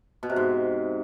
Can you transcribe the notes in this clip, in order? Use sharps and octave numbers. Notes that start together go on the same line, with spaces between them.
B2
C3
G#2